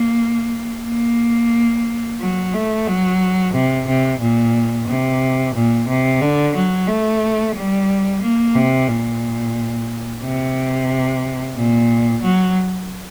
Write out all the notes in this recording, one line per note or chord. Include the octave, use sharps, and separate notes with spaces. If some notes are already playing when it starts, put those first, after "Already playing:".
Already playing: A#3
A#3
F#3
A3
F#3
C3
C3
A#2
C3
A#2
C3
D3
F#3
A3
G3
A#3
C3
A#2
C3
A#2
F#3